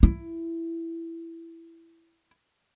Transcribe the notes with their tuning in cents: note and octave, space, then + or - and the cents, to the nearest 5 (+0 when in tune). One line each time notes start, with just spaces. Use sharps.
E4 +10